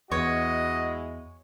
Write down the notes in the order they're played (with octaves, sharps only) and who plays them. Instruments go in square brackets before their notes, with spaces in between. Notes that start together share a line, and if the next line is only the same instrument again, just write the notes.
[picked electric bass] E2 [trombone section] G#3 E4 F#4 [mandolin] C#5 [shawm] D#5